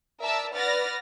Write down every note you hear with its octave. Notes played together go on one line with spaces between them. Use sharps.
A#4 D5 E5 A5 E6
B4 D5 F#5 F6 A6 A#6